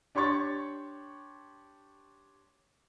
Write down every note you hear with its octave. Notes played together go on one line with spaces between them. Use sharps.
D4 G4 C#5 C6 C#6 A6